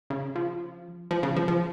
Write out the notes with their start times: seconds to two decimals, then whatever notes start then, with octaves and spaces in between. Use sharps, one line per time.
0.10 C#3
0.35 F3
1.11 F3
1.23 C#3
1.36 F3
1.48 F3